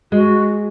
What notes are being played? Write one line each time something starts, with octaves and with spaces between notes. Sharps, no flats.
G#3 F#4